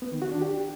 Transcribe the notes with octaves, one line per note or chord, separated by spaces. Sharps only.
B3
D#3
F#4
D4
G4